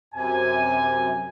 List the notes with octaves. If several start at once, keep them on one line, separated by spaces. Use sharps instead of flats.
F#2 C3 G#5